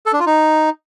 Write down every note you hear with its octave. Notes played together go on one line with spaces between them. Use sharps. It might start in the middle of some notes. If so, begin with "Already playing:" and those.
A4
D4
F4
D#4